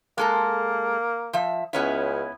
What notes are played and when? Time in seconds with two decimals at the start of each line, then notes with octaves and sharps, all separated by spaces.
0.18 G#3 A#3 A4 A#4
1.33 F3 E5
1.73 C#2 B3 C#4 E4